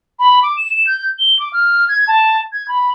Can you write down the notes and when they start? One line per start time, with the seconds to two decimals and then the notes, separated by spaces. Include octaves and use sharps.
0.19 B5
0.43 D6
0.57 E7
0.74 E7
0.87 G6
1.19 G7
1.39 D6
1.53 F6
1.89 G#6
2.08 A5
2.52 G#6
2.68 B5